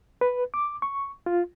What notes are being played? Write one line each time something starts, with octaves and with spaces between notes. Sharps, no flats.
B4
D6
C#6
F4